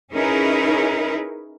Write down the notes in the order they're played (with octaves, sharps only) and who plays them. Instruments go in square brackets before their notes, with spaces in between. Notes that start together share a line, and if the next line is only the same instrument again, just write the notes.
[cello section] C#4 D#4 E4 G#4 A#4 B4